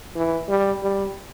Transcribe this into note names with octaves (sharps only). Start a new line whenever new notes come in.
E3
G3
G3